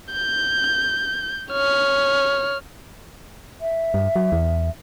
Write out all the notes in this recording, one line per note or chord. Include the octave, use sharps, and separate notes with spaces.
G6
C#5 F6
E5
G2
F#3
E2